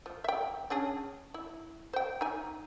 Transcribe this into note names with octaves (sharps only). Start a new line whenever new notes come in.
F3
E5 G5
C#4 D4 G#4
E4
C5 G5
D#4 G#5